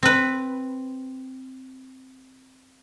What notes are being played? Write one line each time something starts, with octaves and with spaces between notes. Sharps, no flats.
C4 B4